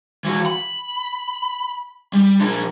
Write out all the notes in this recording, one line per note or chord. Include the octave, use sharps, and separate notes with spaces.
E3 F#4
B5
G3
F3 D4